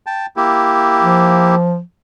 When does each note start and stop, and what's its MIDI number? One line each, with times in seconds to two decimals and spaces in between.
0.06 0.26 79
0.06 0.26 81
0.36 1.55 58
0.36 1.55 64
0.36 1.55 67
1.02 1.80 53